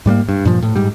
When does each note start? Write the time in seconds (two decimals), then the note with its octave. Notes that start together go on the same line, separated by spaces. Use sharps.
0.06 G#2 G3 G#3 A#3
0.29 G2
0.45 G2 A#2 F3
0.62 A2
0.76 G#2 G3